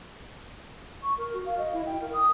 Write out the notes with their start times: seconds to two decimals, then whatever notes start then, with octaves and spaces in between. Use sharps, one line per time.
1.03 C#6
1.18 A#4
1.34 F#4
1.46 F5
1.58 D#5
1.73 E4
1.86 G5
2.01 A#4
2.13 D#6